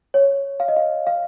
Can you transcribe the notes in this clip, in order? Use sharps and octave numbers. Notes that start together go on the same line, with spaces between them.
C#5
F5
D#5
F5
F5